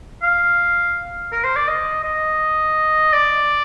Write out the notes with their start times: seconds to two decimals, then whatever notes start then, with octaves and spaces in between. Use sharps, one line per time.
0.23 F5
1.32 A#4
1.44 C5
1.56 D5
1.68 D#5
2.04 D#5
3.13 D5